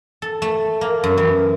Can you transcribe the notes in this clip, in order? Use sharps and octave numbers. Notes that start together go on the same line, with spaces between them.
A4
A3
A#3
F#2
E3